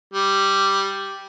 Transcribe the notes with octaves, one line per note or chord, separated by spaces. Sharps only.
G3